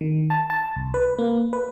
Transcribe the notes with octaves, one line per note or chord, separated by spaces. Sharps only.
D#3
A5
A5
C2
B4
A#3
B4